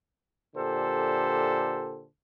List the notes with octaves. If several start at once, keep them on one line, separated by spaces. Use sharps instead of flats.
A#2 D3 G4 A4 C5